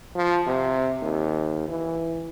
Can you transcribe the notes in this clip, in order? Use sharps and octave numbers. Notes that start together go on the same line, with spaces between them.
F3
C3
D#2
E3